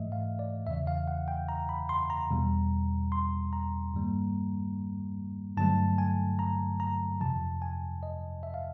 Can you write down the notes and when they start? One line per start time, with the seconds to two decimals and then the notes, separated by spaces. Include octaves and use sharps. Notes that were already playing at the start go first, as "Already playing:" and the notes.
Already playing: G#2 E3 A3 D#5 E5
0.12 F5
0.39 D5
0.67 E2 C#3 E3 E5
0.87 F5
1.08 F#5
1.28 G5
1.49 A#5
1.69 B5
1.89 C6
2.10 A#5
2.30 E2 B2 G3
3.12 C6
3.53 A#5
3.94 G2 D#3 G3 A#3
5.57 G2 D3 F#3 A3 A5
5.98 G#5
6.39 A#5
6.80 A#5
7.21 F2 C3 F3 A5
7.62 G#5
8.03 D#5
8.43 E5
8.54 F5